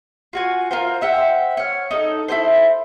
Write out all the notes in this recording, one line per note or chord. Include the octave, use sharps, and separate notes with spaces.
F4 F#4 G#5
F4 A#4 C5
C5 E5 F#5 G5
C#5 F6
D#4 A4
E4 G4 A4 C5